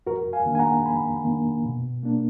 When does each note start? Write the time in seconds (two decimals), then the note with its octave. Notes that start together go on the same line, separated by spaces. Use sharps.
0.07 F2 F#4 A#4
0.33 F5 G#5
0.46 D#3 A#3 D4
0.55 G#5
0.59 F#5 A#5
0.86 F2 G#5 B5
1.24 D#3 A#3 D4
1.64 B2
2.03 A#3 D4